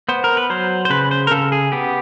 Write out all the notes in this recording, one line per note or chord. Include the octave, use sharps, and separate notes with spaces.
B3 C5
A#4
B4
F#3 C5
C5
C#3 B4
C5
A#4
C#3 A4
G#4
B3 G4